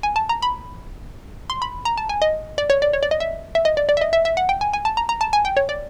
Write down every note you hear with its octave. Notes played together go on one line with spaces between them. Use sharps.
G#5
A5
A#5
B5
C6
B5
A#5
A5
G#5
D#5
D5
C#5
D5
C#5
D5
D#5
E5
E5
D#5
D5
D5
E5
D#5
E5
E5
F#5
G5
G#5
G#5
A5
A#5
A#5
A5
G#5
G5
C#5
D5